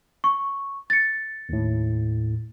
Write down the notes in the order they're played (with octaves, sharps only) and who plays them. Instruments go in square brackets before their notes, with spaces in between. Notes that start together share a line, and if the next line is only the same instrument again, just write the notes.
[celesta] C#6
A6 C#7
[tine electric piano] D#2 A2